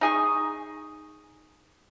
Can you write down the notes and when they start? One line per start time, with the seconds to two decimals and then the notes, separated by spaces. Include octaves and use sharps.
0.01 D#4 G#4 C#6